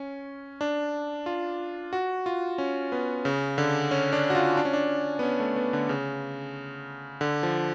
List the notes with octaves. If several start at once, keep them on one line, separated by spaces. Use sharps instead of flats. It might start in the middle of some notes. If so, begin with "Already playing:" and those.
Already playing: C#4
D4
F4
F#4
F4
C#4
B3
C#3
D3
C#4
D4
F#4
F4
D4
C#4
D4
B3
C#4
A3
B3
D3
C#3
D3
F3